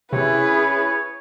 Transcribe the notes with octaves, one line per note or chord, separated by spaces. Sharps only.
C3 C#4 E4 G#4 B4 C#5